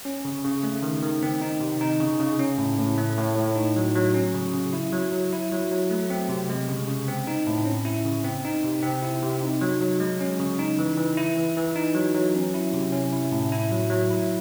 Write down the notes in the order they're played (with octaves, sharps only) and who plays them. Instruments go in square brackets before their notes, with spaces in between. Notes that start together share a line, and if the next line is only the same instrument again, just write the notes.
[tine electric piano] C#4
C#3
C#3
A3
D#3
D#3
C4
D#4
C3
D#4
C#3
C#3
C#4
A2
A2
A3
A2
A2
D#4
F#3
F#3
C#4
C#3
C#3
E4
F#3
F#3
E4
F#3
F#3
A3
C4
C3
G#3
C#3
C#3
C4
D#4
A2
C#4
E4
C#3
C4
D#4
C3
C4
E4
C3
D#4
F#3
F#3
G#3
C#4
C#3
D#4
E3
E3
E4
E3
E3
D#4
F#3
F#3
C#4
E4
C3
C#4
E4
A2
E4
F#3
F#3
E4